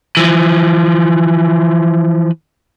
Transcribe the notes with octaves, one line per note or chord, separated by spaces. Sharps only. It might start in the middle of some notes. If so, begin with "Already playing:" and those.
E3 F3